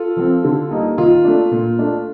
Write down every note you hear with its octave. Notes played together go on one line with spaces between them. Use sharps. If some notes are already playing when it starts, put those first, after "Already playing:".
Already playing: F4 A4
F3 C4
D3
G3 A#3 D#4
D#3 F4
A3 D4
A#2
A3 D4